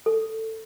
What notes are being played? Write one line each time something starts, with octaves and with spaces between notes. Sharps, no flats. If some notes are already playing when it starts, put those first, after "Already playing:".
A4